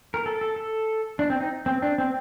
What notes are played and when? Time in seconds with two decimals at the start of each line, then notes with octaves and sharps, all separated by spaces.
0.14 A#4
0.26 A4
0.41 A4
0.56 A4
1.19 D4
1.30 C4
1.40 D#4
1.66 C4
1.82 D4
1.98 C4